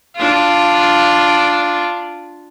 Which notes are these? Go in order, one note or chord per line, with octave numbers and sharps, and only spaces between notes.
D4 F4